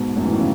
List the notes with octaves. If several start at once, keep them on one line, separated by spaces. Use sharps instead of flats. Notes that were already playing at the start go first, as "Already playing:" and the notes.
Already playing: G#2 B2
F#2 A2
E3
D#3
C#3